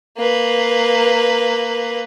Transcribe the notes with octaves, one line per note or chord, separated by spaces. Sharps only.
A#3 B4